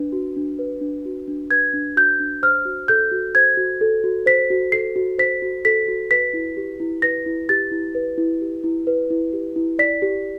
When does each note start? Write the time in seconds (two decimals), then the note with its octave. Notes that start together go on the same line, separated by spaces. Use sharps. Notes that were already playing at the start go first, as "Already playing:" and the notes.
Already playing: D4 B4
0.12 F#4
0.36 D4
0.59 B4
0.81 D4
1.05 F#4
1.28 D4
1.51 B4 G#6
1.73 D4
1.96 F#4 G6
2.20 D4
2.43 C5 F6
2.65 F#4
2.88 A4 G6
3.11 F#4
3.35 C5 G#6
3.57 F#4
3.81 A4
4.04 F#4
4.26 C5 B6
4.50 F#4
4.72 A4 C7
4.96 F#4
5.18 C5 B6
5.42 F#4
5.65 A4 B6
5.88 F#4
6.11 B4 B6
6.33 E4
6.57 G4
6.80 E4
7.02 B4 A#6
7.26 E4
7.49 G4 A6
7.71 E4
7.95 B4
8.18 E4
8.41 G4
8.64 E4
8.87 B4
9.10 E4
9.33 G4
9.56 E4
9.79 D5 B6
10.02 G4